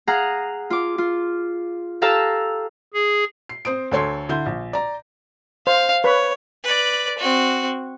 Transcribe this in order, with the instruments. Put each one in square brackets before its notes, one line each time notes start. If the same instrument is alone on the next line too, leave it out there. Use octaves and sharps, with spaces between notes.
[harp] G#4 F5 F#5 A#5
F4 D6
F4
G4 A4 F5 A5 A#5 E6
[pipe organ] G#4
[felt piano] C7
C4 C5 D#6 D7
D2 A4 C#5 C6 C7
D3 E4 C6 G6
A#1
D5 A#5
[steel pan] C5 [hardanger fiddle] F5
[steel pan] B4 B5 [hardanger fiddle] C#5
[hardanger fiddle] B4 D5
C4 F#4